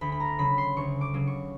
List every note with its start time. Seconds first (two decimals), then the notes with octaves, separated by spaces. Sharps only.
0.01 D2 B5
0.12 B5
0.20 A#5
0.38 C#3 F#3 B5
0.58 C6
0.77 D2 C#6
1.01 D6
1.14 C#3 F#3
1.27 C#6